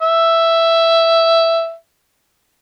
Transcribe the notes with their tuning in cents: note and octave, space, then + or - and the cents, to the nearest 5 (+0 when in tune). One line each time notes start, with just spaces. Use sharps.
E5 +5